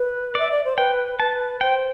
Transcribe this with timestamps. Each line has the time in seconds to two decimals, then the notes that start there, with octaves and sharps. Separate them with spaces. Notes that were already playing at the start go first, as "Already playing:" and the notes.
Already playing: B4
0.35 D5 E5
0.51 D5
0.65 C5
0.77 B4 G5
1.20 B4 A5
1.61 C5 G5